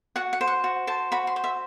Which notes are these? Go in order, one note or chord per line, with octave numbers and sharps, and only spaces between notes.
F#4 F#5
F#5
C5
F#5
F#4
C5 A5
F#4 B5
C6
C5
E5